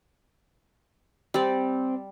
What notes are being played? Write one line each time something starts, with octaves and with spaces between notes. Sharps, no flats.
G3 C4 D5